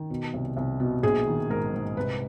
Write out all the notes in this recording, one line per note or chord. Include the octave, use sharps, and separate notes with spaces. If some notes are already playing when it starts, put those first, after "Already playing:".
Already playing: D#3
B2
C2
C2
B2
A#1 G#4
D#3
G#2 A#4
G#2
C2 B4